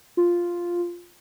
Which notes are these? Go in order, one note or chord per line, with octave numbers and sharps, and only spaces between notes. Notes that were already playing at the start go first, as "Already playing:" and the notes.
F4